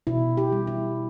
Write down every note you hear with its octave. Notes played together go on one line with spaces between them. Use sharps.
B2 E4
G4
G3
E4